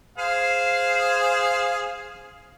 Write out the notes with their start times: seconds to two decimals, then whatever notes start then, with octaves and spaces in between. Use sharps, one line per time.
0.18 G#4 C5 F5